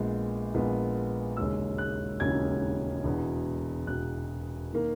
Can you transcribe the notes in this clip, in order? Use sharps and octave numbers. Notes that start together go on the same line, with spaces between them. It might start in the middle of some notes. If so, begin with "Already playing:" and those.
Already playing: A#1 A#2 G#3 B3
A#1 A#2 G#3 B3
E1 D#2 C#3 G#3 C#4 E6
F#6
E1 D#2 C#3 G#3 C#4 G#6
E1 E2 B2
E1 E2 B2 F#6
D#3 A#3